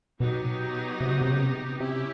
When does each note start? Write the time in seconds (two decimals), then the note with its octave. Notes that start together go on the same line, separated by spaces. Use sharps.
0.20 B2 F#3 B3 D#4 G4
1.00 C3
1.11 C#3
1.21 C3
1.32 C#3
1.42 C3
1.80 C3 C#4 E4 G4